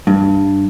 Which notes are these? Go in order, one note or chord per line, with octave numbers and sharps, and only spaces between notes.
G2